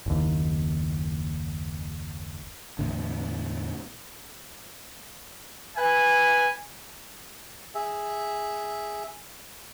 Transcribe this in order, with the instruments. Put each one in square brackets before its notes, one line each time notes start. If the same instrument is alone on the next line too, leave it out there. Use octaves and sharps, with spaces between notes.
[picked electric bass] F#1 D#2
[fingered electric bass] E2 A2 D3
[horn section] B4 E5 G#5
[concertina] G#4 E5